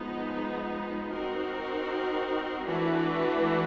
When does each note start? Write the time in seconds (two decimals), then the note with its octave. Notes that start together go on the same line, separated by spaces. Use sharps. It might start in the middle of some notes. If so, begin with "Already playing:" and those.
Already playing: F3 G#3 B3 D#4
1.11 C4 D#4 F#4 A#4
2.66 E3 A3 D4 F#4 B4